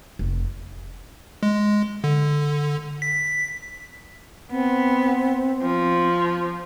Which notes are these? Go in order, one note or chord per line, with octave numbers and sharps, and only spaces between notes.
F1
G#3
D3
B6
B3 C4
F3